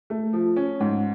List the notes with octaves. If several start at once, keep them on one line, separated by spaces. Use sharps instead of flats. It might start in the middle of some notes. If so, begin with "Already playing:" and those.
A3
F3
C#4
G#2